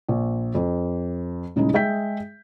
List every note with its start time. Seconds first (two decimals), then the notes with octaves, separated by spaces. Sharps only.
0.09 A#1
0.55 F2
1.56 D#1 C#3 G#3 C#4 D#4 E4
1.74 G#3 G#4 E5 G5 G6 B6